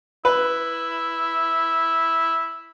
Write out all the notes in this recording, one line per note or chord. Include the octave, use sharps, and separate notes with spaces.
E4 B4